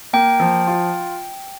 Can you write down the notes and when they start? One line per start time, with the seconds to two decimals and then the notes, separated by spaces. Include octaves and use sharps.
0.13 A#3 G5
0.40 F3
0.67 F4